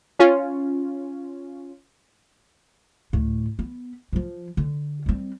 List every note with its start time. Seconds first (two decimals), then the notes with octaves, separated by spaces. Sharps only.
0.19 C#4 F4
3.13 D2 A2
3.59 B3
4.12 D2 F3
4.57 D3
5.06 G3 C4